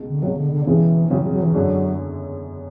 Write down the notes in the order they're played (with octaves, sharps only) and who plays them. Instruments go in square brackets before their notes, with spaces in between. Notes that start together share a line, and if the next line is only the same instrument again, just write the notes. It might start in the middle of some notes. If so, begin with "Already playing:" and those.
Already playing: [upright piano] C#2 B2 G#3
[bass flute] D3
[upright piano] C#2 B2 G#3 [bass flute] F#3
[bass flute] D3
D3
[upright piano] E1 E2 C#3 G#3 C#4 [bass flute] E3
[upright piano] E1 E2 C#3 G#3 C#4 [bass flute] F#3
[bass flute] F#3
F#3
E3
[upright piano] F#2 D3 G#3 D4 [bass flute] F#3